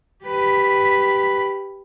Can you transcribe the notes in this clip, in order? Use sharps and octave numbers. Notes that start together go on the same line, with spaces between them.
G4 B4